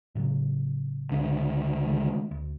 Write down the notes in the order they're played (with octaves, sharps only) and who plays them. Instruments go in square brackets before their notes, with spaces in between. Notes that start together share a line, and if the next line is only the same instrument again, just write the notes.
[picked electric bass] A2 C#3 F#3
[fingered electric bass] C#2 D3
[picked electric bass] D#3 G#3 A3
D2